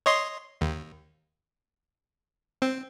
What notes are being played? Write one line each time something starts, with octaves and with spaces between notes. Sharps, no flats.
C#5 D#5 C6
D#2
C4